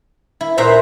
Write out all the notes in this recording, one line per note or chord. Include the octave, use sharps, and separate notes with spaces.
E4
A#2 B4 C5 E5 A#5